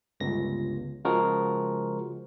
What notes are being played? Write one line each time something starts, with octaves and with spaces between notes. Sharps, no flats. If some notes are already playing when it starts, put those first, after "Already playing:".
G1 C#2 A#6
C#3 F3 G#3 F#4 A#4